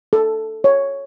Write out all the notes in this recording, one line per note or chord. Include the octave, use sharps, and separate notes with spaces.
A4
C#5